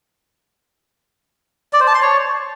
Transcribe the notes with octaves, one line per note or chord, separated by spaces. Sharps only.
D5
C5
A5
C6
C#5